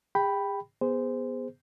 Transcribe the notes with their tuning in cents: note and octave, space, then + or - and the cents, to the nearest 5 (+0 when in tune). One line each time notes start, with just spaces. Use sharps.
G#4 -45 G5 +0 B5 +0
B3 -5 G#4 -15 C5 -15